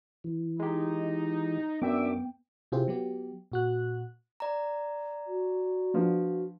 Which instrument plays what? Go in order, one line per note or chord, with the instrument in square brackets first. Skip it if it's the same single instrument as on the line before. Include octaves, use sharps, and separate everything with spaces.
[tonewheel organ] E3
[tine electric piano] G#3 G4 [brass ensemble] D#4
[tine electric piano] F#2 [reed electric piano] B3 G5 [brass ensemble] D4 E5 [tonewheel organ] D6
[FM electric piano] C3 E4 F4 G4 G#4 C5
F#3 B3 G4
A#2 F#4 F#6
[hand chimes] D5 A#5
[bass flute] F#4
[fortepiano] D3 F3 B3